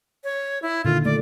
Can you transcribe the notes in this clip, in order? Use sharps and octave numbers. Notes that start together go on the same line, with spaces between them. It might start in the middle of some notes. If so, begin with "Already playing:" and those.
C#5
E4
A#2 D3 D#3 F4
A3 D5